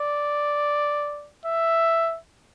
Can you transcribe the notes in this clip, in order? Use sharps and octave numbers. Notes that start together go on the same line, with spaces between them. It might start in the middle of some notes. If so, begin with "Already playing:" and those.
Already playing: D5
E5